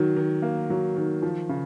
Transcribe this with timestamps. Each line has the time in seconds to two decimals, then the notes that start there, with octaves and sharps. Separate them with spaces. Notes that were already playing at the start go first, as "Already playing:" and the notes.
Already playing: D#3 F#3
0.16 D#3
0.42 A#3
0.70 F#3
0.96 D#3
1.22 F3
1.49 C#3